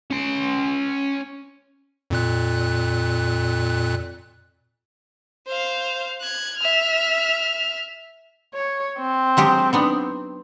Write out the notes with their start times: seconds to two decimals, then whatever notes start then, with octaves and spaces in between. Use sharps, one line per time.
0.11 C#4 C6
2.10 F2 A#2 F#6
5.47 C5 F5
6.21 F#6 G#6
6.58 E5 F6
8.54 C#5
8.99 C4
9.37 F#3 G#3 G4
9.73 B3 D4 D#4